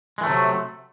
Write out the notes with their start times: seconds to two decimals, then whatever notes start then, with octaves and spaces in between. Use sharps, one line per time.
0.18 G#3
0.21 E3
0.23 A3
0.26 F#3
0.29 C3